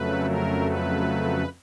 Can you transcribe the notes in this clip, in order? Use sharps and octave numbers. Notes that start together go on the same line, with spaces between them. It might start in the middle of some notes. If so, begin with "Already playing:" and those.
Already playing: F2 C#3 F#3 A3 B4
A#4
B4